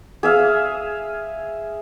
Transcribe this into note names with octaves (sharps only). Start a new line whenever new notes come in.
G#4 E5 F5